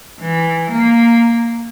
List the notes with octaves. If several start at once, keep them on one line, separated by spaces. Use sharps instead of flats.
E3
A#3